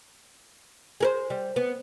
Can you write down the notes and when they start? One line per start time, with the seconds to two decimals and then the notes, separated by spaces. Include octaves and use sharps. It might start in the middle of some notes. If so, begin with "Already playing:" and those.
1.00 G#4 A#4 C5
1.30 G3
1.56 B3